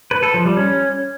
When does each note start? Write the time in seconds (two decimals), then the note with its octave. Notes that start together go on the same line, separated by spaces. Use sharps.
0.11 B4
0.23 A4
0.34 F3
0.45 G3
0.57 C#4